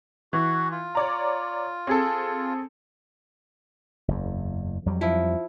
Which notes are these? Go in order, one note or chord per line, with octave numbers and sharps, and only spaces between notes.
E3 F#4
F4
C#5 D5 A#5
C4 G#4 A4
F#1 E2
F2 F#3 G3
F3 E4